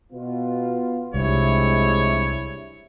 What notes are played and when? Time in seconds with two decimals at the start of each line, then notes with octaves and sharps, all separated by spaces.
0.12 B2 B3 F4
1.14 C2 C3 F3 G3 G#3 D4 E4 C#5